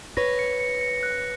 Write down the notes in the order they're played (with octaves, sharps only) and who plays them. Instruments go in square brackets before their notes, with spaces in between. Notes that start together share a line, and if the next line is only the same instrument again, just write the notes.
[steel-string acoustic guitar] B4 C#5 [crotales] A#6
[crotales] C#7
C#7
C#7
F#6